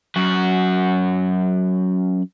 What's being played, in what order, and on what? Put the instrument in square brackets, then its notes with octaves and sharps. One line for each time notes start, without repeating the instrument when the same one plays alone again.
[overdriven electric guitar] F#2 F#4